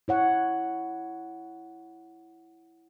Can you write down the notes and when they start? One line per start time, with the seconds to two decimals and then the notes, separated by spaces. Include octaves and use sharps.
0.08 E4 C#5 F#5